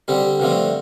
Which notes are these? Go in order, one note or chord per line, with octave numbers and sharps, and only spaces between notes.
D3 G3 C4 G4
G2 D3 F3 A3 C4